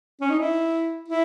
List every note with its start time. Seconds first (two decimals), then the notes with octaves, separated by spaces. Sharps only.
0.21 C#4
0.30 D#4
0.39 E4
1.08 E4